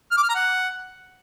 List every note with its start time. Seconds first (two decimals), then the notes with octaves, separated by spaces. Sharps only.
0.11 F6
0.17 D6
0.23 F6
0.29 A#5
0.35 F#5